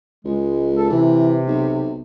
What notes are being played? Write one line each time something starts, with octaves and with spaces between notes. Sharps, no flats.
C#2 G#3
A4
C3 E3
B1